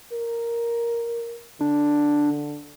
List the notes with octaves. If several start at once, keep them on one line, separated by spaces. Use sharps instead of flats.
A#4
D3 D4